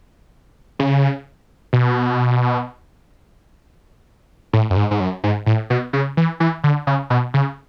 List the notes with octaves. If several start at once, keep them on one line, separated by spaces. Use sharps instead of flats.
C#3
B2
A2
F#2
G#2
G#2
F#2
G#2
A2
B2
C#3
E3
E3
D3
C#3
B2
C#3